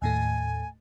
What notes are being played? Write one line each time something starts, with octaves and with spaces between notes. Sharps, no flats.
D#2 A2 A3 G#5